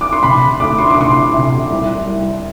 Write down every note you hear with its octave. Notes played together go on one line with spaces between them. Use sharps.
D6
C6
C3 B5
D2 D6
C6
D6
C3 C6
C3
C2
C2